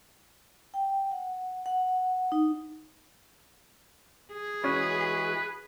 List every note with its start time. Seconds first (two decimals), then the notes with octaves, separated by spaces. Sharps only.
0.74 G5
1.12 F#5
1.66 F#5
2.32 D#4
4.32 G#4
4.64 E3 G#3 C#4 F#4 B4